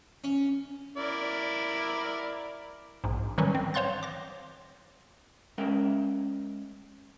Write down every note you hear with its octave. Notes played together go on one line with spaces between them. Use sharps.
C#4
E4 A#4 D5
A#1 G#2
D#3 E3 F#3 G3 C#4
C4
C5 C#5 F5 C6 F#6 A6
D6 A#6
G#3 C#4 A#4 E5 G5